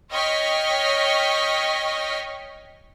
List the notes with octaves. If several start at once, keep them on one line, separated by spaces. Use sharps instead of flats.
C#5 D#5 G5 C#6 F6 B6